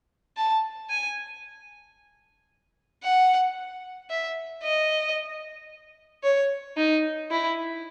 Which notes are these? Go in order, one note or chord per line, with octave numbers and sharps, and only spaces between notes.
A5
G#5
F#5
E5
D#5
C#5
D#4
E4